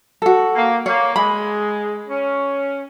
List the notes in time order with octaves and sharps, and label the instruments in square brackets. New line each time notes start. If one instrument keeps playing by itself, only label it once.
[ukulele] F#4 A4
[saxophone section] A#3
[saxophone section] A#3 [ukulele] C#5
[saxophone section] G#3 [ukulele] B5
[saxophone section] C#4